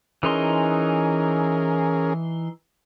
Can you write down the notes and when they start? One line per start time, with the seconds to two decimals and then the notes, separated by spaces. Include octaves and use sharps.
0.23 E3 C#4 D#4 G#4 A#4 C6